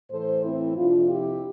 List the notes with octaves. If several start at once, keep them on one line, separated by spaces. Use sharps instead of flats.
A2 E3 A4 C5
C4 E4
F2 C3 F3 D4 F4
E4 G4